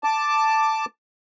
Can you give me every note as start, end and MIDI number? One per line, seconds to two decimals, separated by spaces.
0.04 0.85 81
0.04 0.85 86